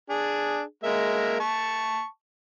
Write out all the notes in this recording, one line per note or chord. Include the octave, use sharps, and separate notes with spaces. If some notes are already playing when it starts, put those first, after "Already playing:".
D4 G#4
G#3 A#3 E5
A5 C#6